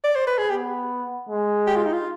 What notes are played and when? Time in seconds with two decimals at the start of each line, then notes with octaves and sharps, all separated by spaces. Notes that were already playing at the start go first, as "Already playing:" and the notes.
0.04 D5
0.16 C5
0.27 B4
0.38 G#4
0.50 B3 G4
1.29 G#3
1.67 G4
1.76 F4
1.86 D#4
1.93 F4